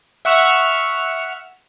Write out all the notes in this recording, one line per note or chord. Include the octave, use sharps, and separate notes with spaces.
E5 F#5 C#6 E6 F6